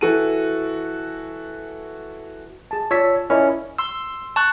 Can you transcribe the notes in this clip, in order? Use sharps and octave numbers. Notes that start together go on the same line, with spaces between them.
E3 F#4 A4 D#7
G#4 A5
F4 C#5 D5 A5 E6 B6
C#4 E4 A#4 D5 D#5
C6 E6
A5 C#6 F#6